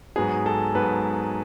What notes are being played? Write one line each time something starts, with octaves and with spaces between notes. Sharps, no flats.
G#2 F#3 B3 G#4
A4
G#2 F#3 B3 B4